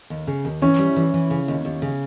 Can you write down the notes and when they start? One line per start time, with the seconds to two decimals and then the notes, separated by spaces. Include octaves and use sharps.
0.10 D#2
0.27 C#3
0.45 D#2
0.62 E3 C#4
0.79 G3
0.96 E3
1.14 E3
1.31 C#3
1.48 D#2
1.65 D#2
1.82 C#3